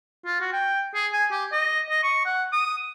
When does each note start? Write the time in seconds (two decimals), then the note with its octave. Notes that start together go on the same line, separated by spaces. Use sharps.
0.25 F4
0.41 F#4
0.52 G5
0.95 G#4
1.13 G#5
1.31 G4
1.52 D#5
1.89 D#5
2.03 C#6
2.26 F#5
2.52 D#6